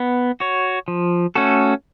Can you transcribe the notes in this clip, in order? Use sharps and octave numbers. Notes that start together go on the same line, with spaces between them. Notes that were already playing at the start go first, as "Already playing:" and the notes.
Already playing: B3
F#4 C#5
F3
A3 C#4 F#4 A4